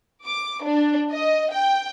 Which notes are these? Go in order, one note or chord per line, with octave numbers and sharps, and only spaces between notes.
D6
D4
D#5
G5